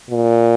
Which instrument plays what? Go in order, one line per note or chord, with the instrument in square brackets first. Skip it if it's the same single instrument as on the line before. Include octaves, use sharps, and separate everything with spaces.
[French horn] A#2